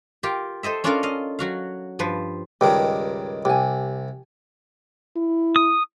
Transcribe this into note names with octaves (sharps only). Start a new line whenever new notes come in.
F4 G4 A#4
A4 C5 D#5 E5
C#4 D4 F4 A4 A#4 F5
D#5 F5
F#3 F#4 F5
G2 F3 B4
C#2 G2 D#3 G4
C2 G4 G#5
E4
D#6